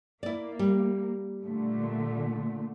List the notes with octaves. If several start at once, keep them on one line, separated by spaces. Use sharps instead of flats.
A#3 E4 D5
G3
A#2 D3 A3